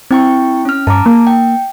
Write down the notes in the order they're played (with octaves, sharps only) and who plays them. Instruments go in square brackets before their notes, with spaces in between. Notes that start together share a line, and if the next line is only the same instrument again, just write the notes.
[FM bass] C4 [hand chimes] E4 G5 C#6
[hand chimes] C#4 F6
[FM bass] G2 [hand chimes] A5 A#5 D6
[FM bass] A#3
[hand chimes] G5